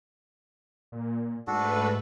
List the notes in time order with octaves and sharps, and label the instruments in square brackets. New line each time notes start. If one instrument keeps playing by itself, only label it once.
[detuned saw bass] A#2
[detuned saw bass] G#2 [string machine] A3 B4 [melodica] D4 F#4 A4